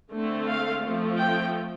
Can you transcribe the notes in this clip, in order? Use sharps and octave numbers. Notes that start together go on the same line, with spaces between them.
D3 A3 C4
F5
F3 A3 C4
G5